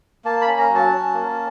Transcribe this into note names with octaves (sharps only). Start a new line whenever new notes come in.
A#3 A5
B5
C#4
A#5
F#3
A5
C#4
A#3